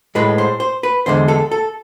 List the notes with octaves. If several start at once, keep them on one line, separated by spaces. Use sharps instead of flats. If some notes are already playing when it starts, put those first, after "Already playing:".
A2 G#3 B4
C5
C5
B4
E2 D3 G#3 C5
A4
A4